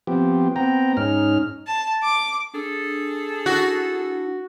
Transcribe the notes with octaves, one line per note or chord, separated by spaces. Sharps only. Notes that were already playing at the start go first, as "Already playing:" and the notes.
F3 B3 C4 G4
B3 C4 G5 A#5
G#2 C#4 D#4 F6
A5
D6
D4 G#4 A4
E4 F#4